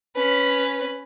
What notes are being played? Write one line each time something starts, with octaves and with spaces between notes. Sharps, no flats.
C#4 B4